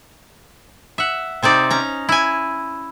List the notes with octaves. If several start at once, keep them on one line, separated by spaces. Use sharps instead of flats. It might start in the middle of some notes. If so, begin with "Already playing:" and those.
E5 F#5
C3 C4 D#4 D5
C#4 A#5
E4 G#5